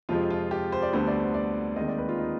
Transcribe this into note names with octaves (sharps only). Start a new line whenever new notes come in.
F2 C3 F3 G#3 C4 F4
F4
G4
C5
D5
D2 D3 G3 B3 C5
D5
C5
D5
D#2 D#3 G#3 C4 D#5
D5
B4
F4
D#4